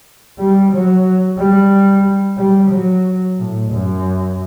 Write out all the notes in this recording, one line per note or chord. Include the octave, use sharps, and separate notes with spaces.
G3
F#3
G3
G3
F#3
A2
F#2